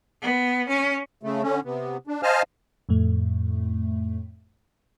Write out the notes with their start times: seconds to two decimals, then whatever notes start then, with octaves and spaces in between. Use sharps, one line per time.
0.22 B3
0.68 C#4
1.23 C#3 A3
1.42 D3 C#4
1.65 C3 B3
2.07 D4
2.23 C5 D#5 F5 G#5 A5 F6
2.89 F2 A2 A3